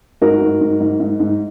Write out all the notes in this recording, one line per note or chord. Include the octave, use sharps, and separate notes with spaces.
G#2 F#4 A#4
G#2
G#2
G#2
G#2
G#2